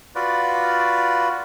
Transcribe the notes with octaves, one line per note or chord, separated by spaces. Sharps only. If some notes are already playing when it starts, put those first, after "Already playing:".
F4 F#4 B4 D5